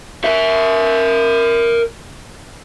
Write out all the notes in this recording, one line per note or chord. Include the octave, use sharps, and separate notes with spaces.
A#4 E5